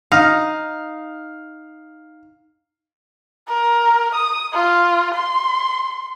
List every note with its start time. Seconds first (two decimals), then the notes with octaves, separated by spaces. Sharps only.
0.12 D#4 F5
3.48 A#4
4.15 D#6
4.53 F4
5.15 C6